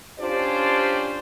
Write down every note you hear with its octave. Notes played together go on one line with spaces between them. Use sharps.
C#4 D4 F4 G4 C5 D5